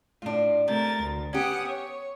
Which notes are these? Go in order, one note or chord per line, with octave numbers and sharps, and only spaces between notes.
A2 D4 F4
C3 A3 A#4 A6
D2
B3 C#4 G4 F#5 D#6
C#5